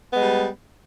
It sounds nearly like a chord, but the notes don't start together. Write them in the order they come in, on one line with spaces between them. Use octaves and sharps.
B3 G#3 G3